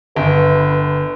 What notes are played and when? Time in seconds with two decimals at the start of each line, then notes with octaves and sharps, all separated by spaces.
0.16 G1 B4